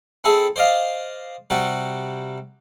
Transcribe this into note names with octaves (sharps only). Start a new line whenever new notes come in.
C4 E4 G#4 A4
C5 D5 D#5 F5
C3 G3 F#4 G4